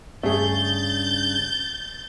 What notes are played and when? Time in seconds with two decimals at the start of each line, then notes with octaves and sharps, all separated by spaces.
0.23 G2 C#3 A3 G#4 G6 A6